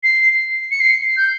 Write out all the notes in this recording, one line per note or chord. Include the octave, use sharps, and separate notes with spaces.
C7
C#7
C7
G6